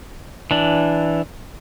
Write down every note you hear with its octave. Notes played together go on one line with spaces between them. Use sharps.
E3 D4